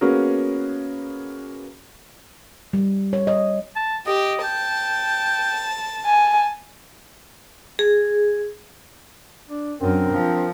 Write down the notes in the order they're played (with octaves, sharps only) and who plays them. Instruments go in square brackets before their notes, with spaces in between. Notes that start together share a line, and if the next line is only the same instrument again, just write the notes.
[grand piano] A#3 B3 C#4 F#4 G#4 A#4
[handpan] G3
C#5
D#5
[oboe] A5
[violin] G4 [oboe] D#5
[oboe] G5 [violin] A5
[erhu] G#5
[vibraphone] G#4
[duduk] D4
[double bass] F#2 [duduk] C4 [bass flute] D4 [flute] A#4
[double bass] F3